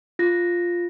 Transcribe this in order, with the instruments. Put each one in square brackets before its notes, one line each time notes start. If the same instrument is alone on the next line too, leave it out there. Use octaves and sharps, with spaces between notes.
[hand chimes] F4 A#6